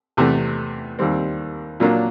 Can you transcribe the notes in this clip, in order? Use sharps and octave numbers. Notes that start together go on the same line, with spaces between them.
E2 C3 E3 A3
D#2 D#3 G3 C4
A#2 F#3 A#3 D4